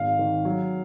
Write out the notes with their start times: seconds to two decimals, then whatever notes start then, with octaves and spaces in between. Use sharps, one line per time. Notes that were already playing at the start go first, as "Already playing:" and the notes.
Already playing: G#1 F5
0.19 D#3
0.45 F#3